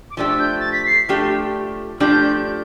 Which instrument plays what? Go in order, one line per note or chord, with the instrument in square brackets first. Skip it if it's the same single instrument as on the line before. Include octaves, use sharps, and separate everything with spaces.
[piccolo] D6
[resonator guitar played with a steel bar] F3 A3 D4 G4 [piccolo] E6
[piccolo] G6
A6
B6
C7
[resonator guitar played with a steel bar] F3 A3 D4 G4
[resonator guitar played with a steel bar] F3 A3 D4 G4 [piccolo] G6